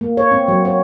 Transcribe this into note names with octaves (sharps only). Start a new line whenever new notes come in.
A#3
C#5
C4
F#3
C#5